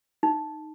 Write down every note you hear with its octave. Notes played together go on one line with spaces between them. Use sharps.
D#4